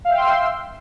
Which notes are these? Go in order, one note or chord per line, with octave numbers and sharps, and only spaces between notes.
E5 F5 G5 C6 E6